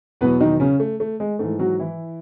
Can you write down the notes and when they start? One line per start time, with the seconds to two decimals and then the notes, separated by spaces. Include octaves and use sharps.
0.21 E2 B2 F#3 B3 B4
0.40 D#3 D#4
0.60 C#3 C#4
0.80 A3
1.00 A3
1.20 G#3
1.39 G#2 E3 A3
1.59 F#3 F#4
1.79 E3 E4